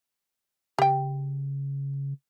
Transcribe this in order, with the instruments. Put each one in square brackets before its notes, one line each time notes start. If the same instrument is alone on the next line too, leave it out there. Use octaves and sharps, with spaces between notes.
[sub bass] C#3 [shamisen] G4 G5